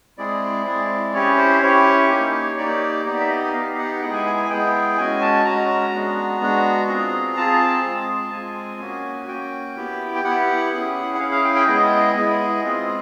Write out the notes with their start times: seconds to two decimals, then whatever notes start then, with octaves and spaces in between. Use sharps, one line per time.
0.18 G#3 C4 E4 G#4 D5
0.66 G#3 C4 E4 G#4
1.14 C#4 E4 G4 C#5
1.38 C5
1.62 C#4 E4 G4 C#5
2.10 A#3 D#4 G4
2.58 A#3 D#4 G4 D5
3.05 B3 D#4 G4 D5
3.20 E5
3.30 D#5
3.53 B3 D#4 G4 F5
3.78 F#5
4.01 G#3 B3 E4 G#4 G5
4.13 G#5
4.26 G#5
4.37 G#5
4.49 G#3 B3 E4 G#4 G5
4.97 G#3 C#4 F#4 G#5
5.22 A5
5.45 G#3 C#4 F#4 A#5
5.93 G#3 B3 D4 F#4
6.41 G#3 B3 D4 F#4
6.88 C4 F4 G#4
7.37 C4 F4 G#4 A5
7.84 G#3 C4 F4 G#4
8.32 G#3 C4 F4 G#4 G#5
8.80 A#3 C#4 F#4
9.28 A#3 C#4 F#4 G5
9.76 B3 E4 G4
10.15 G5
10.24 B3 E4 G4 F#5
10.72 C#4 E4 G#4
11.15 F#5
11.19 C#4 E4 G#4 F5
11.32 F5
11.44 G5
11.55 G5
11.67 G#3 B3 E4 G#4 D#5
12.15 G#3 B3 E4 G#4
12.63 G#3 C4 F4 G#4